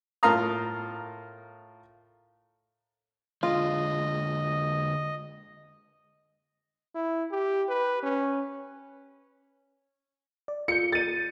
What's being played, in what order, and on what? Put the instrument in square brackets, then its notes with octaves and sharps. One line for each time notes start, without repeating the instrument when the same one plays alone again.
[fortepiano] A2 F4 A#4 F5 A#5 D#6
[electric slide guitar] D3 G#3 [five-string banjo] F4 [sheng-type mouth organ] D#5
[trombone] E4
G4
B4
C#4
[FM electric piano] D5
[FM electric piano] F4 G6 [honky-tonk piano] C#7
[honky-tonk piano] A6 D#7